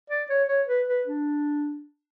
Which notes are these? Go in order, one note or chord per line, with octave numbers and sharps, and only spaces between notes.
D5
C#5
C#5
B4
B4
D4